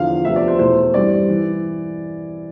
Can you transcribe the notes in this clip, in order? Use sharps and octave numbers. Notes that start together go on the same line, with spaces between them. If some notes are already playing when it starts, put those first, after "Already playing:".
Already playing: E2 D3 F3 F5
D2 C3 F3 B3 E5
D5
C5
E2 B2 A3 C5
G2 E3 G3 C4 D5
E3